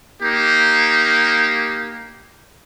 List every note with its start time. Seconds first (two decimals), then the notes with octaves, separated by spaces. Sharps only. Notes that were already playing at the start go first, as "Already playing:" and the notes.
0.22 A#3 D#4 G4